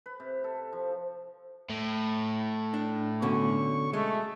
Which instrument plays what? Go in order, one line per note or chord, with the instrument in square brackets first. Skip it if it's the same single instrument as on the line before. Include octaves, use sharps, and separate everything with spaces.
[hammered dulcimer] B4
C3
A4
F3
[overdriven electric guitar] A2
[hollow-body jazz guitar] D4
[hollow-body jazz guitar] B2 D3 C#4 [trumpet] C#6
[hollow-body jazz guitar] G#3 [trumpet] A3